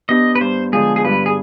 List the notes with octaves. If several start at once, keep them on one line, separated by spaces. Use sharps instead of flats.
B3 D4 G4 D#5
B4
G2 C5
D3 F3 G#3 G#4
G#4
G2 B4
G#4